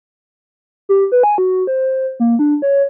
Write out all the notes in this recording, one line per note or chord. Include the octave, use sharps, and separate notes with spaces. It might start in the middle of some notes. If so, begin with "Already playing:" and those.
G4
B4
G#5
F#4
C5
A#3
D4
C#5